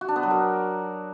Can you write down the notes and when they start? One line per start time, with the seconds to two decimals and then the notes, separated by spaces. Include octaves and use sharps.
0.01 F#4
0.08 D4
0.16 B3
0.23 F#3
0.30 A#4